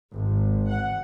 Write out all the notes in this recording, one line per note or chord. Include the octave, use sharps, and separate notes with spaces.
G#1
F#5